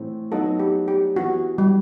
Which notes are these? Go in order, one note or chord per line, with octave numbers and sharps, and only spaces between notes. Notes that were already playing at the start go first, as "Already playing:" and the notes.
Already playing: A2 E3 A3 C4
F#3 B3 D#4 F#4 A4
G4
G4
E3 B3 E4 F#4 G4
G3